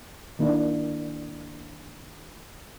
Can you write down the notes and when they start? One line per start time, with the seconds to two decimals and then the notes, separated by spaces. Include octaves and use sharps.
0.39 D#3 A#3 D4 E4